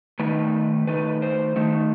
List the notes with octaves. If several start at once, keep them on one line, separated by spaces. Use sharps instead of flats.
D#3 A3 D#4 B4
D#3 A3 D#4 B4
C5
D#3 A3 D#4